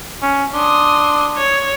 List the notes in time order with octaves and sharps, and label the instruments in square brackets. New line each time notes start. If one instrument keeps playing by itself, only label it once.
[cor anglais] C#4
[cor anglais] D4 [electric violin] C6 D#6
[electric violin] C#5